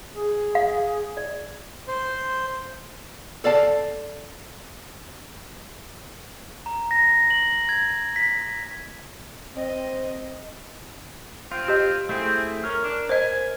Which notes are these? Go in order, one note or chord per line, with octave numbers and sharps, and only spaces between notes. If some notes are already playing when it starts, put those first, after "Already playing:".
G#4
F5
D5
C5
A4 D5 F5 A5
A#5
A#6
F#7
G#6
B6
C4 D#5
C4 F4
G4 D#5
A3 C4 E4 G#4
C#4 A#4 F6
D4
C5 D#5 G#5